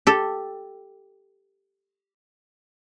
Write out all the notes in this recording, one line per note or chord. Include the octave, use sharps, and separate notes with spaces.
G4 A4